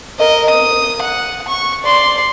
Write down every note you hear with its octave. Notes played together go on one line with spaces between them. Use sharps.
A#4 D#5
D#6
F#5
C#6
D5 C6